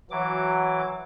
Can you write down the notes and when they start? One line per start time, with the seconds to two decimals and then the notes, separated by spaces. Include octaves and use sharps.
0.11 E3 F#3 D6